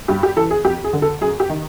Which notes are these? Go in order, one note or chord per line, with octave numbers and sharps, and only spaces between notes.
G2 G4
G4
E3 A4
G#4
F2 G4
G#4
D3
A4
F#2 G#4
G4
D#3